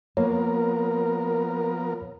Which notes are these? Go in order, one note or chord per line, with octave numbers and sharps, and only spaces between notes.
F3 A#3 B3 A#4 C#5